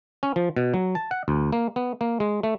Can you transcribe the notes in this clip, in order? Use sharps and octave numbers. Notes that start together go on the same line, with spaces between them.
C#4
F3
B2
F#3
A5
F#5
D2
A#3
B3
A#3
G#3
A3